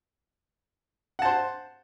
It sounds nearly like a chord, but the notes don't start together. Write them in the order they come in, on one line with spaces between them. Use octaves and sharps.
F#5 A5 C5